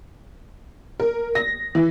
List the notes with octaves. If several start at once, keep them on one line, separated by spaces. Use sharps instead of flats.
A#4
A#6
E3